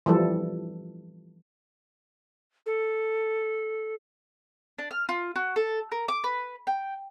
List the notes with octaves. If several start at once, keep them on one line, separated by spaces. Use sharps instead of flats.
E3 F3 G3 A4
A4
D4
F6
F4
F#4
A4
A#4
D6
B4
G5